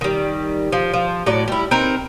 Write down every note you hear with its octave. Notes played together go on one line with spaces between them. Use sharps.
D#3 G3
F3
F3
A2 F#3 D5
G3 E4
C4 D#4 A#4